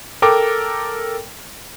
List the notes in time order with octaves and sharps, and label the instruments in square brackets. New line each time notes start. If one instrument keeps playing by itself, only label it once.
[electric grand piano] A4 A#4 G5 D6